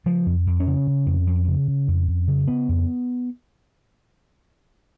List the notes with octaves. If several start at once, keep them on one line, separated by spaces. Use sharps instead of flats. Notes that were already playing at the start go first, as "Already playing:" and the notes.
C#3 F3
F2
F2
C#4
C#3
C#3
F2
F2
C#3
C#3
F2
F2
C#3
C#3 B3
F2